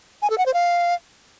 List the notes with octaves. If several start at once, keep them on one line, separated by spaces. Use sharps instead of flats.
G#5
A4
F#5
C5
F5